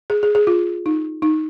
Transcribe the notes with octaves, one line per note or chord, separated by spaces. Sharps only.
G#4
G#4
G#4
F4
D#4
D#4